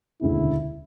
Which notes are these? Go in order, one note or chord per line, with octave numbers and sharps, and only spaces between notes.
E1 D2 C#3 E4